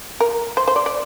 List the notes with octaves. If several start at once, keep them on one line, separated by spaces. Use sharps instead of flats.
A#4
C5
C5
D5
D5